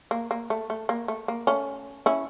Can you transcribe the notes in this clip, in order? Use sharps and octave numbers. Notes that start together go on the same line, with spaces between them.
A#3
A#3
A3
A3
A#3
A3
A#3
A3 C#4
C#4 E4